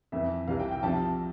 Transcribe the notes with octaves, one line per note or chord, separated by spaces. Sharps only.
F2 E3 E5
C2 C3 E3 F5
G5
G5
C2 C3 F3 A5